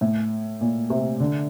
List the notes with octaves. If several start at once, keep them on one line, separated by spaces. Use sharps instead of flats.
A2
A#2
C3
D3